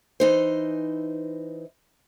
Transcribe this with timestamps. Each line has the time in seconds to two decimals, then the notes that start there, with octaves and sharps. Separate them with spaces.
0.20 E3 D#4 C5